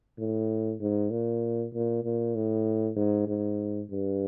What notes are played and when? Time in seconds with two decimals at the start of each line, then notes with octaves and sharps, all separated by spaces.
0.19 A2
0.81 G#2
1.11 A#2
1.74 A#2
2.04 A#2
2.35 A2
2.97 G#2
3.28 G#2
3.90 G2